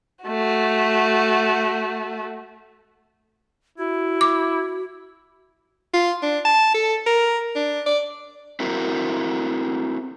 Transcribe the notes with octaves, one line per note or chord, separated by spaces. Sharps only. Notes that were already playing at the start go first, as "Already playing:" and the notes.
A3 F#4
E4 F#4
D6
F4
D4
A5
A4
A#4
D4
D5
C4 E4 F#4 A#4